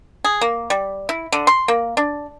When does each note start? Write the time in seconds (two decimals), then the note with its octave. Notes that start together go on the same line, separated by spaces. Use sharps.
0.24 G#4
0.41 A#3
0.70 G3
1.09 E4
1.32 D3
1.47 C6
1.68 A#3
1.97 D4